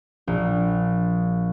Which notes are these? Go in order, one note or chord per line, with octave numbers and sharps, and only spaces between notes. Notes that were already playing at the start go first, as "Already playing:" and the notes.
A#1